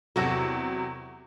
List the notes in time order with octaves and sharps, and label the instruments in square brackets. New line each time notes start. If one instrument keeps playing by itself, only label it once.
[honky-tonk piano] E2 C3 F#3 [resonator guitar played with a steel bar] E4 F#4 A4